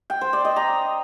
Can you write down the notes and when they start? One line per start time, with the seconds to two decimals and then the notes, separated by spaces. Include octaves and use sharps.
0.10 G5
0.21 C5
0.33 D5
0.45 D#5
0.56 A#5